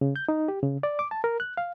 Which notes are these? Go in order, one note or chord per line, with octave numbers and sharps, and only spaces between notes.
C#3
G6
D#4
G4
C#3
D5
D6
A5
A#4
F#6
F5